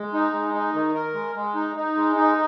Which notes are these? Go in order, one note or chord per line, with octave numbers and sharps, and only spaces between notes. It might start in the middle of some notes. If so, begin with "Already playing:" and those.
Already playing: G#3
D#4
G#3
D#4
D#3
A#4
G#3
G#3
D#4
D#4
G#3
D#4